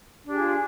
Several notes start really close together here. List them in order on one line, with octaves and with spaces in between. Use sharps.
D4 G4 G#4 F4